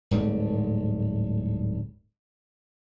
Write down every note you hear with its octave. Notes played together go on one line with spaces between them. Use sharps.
D1 G#2 G3 A3